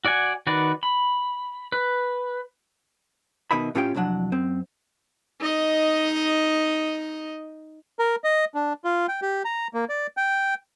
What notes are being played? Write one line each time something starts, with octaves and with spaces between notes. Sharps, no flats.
F#4 D5 F#5 G#5
D#3 F#4 B4 D5
B5
B4
B2 D#3 D#5 E5 B5
A2 C#4 F4 G4 C#5 G5
C2 F2 F#3 D4 F#5
F#2 C4
D#4 D#5
A#4
D#5
D4
F4
G5
G4
A#5
A#3
D5
G5